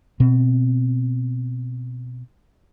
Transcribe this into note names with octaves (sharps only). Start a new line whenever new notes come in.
B2 C4